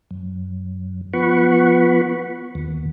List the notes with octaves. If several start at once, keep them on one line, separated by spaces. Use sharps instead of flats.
F#2
F3 B3 F#5 B5 C#6
D#2